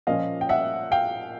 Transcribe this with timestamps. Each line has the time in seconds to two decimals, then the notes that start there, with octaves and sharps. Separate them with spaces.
0.07 A#2 F3 A#3 C#4 D#5 F5
0.41 G5
0.49 E5 F#5
0.92 F5 G5